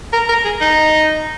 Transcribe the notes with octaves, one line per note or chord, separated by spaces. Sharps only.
A#4
A#4
G#4
D#4